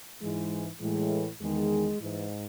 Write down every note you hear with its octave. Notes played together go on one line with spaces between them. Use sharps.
G#2 E3 G#3
A2 E3 G#3
E2 D#3 G#3
G#2 E3